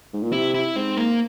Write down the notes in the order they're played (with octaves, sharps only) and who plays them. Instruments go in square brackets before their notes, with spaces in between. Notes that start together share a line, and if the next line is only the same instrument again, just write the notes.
[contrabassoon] G#2
A#2
[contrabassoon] C3 [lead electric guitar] E4
[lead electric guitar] E4
[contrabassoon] G#2 [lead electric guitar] C4
[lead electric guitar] A#3